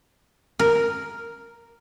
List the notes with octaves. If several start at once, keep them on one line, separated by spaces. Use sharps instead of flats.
A#4